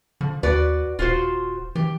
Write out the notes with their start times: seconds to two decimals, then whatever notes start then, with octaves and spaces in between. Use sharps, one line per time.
0.21 D3 F3
0.43 D#2 F#4 B4 D5
0.99 D#1 F4 F#4 C5
1.75 E3 G4